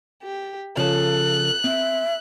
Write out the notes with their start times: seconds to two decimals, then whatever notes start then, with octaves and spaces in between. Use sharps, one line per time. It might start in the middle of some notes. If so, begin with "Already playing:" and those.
0.22 G4
0.77 C#3 F3 A4 A5 F#6
1.64 C4 E5